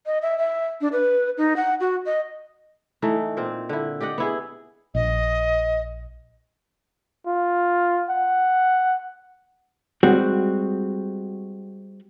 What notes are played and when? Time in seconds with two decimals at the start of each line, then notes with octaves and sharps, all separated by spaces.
0.06 D#5
0.22 E5
0.38 E5
0.81 D4
0.92 B4
1.38 D#4
1.56 F#5
1.80 F#4
2.06 D#5
3.02 E3 A3 D#4
3.37 A#2 C4
3.69 D3 E4
4.01 G4 D5 D#5 F#5
4.18 B3 E4 G#4
4.95 A#1 D#5
7.27 F4
8.10 F#5
10.03 G3 G#3 C4 F#4